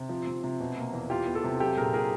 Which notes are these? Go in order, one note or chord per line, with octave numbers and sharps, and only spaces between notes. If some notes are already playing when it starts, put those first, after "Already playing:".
Already playing: C3
F3
C3
C3
B2
A#3
E2
E3 F4 G4
B3
G4 A4
C3
F#3 G4 A4
A#2 G#4 A#4
A#2 G#4 A#4